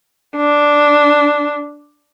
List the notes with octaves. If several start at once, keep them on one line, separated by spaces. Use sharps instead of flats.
D4